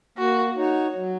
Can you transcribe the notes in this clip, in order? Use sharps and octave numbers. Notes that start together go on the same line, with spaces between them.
A#3 F#4
D#4 F#4 C#5
F#3